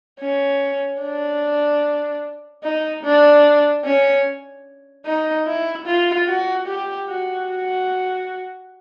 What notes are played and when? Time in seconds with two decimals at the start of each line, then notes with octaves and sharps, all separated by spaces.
0.20 C#4
1.01 D4
2.64 D#4
3.04 D4
3.85 C#4
5.06 D#4
5.47 E4
5.86 F4
6.28 F#4
6.68 G4
7.08 F#4
7.49 F#4